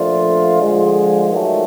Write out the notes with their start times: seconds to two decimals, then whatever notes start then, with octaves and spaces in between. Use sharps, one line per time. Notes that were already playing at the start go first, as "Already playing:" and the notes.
Already playing: A#2 F3 A3 D4 F4
0.59 D3 F3 G#3
1.30 D#3 F#3 A3